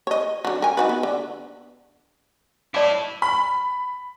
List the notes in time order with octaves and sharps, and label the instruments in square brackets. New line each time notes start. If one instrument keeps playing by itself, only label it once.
[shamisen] C#5 D#5
D3 F#3
A#4 G#5
D#4 F#4 B4
B3
D3
[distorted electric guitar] E4 A5 [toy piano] D5 D6
[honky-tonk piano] B5